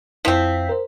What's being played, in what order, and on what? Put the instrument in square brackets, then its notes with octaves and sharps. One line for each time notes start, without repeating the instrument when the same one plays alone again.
[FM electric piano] F2 E4 B6 [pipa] F3 C4
[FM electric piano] A#4 C5